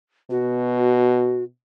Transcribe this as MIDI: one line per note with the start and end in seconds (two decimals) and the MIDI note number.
0.30 1.48 47
0.30 1.44 66